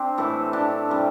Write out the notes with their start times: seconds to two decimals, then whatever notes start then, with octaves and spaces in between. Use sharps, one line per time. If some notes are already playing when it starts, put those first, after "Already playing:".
Already playing: C4 D4 G4
0.18 A2 E3 A3 E4 A4
0.53 D4 G4
0.89 C3 E3 G3